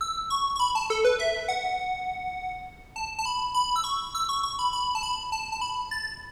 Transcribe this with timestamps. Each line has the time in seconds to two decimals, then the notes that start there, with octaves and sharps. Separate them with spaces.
0.01 E6
0.30 C#6
0.56 C#6
0.60 B5
0.75 A5
0.90 A4
1.05 B4
1.19 E5
1.48 F#5
2.96 A5
3.19 A5
3.26 B5
3.54 B5
3.76 E6
3.84 C#6
4.15 E6
4.29 C#6
4.43 C#6
4.59 B5
4.73 B5
4.95 A5
5.03 B5
5.32 A5
5.52 A5
5.61 B5
5.91 A6